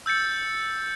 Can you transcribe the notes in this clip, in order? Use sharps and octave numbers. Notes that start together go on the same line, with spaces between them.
E6 G6 A6 C#7